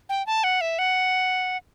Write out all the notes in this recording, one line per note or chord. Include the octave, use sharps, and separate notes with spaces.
G5
A5
F#5
E5
F#5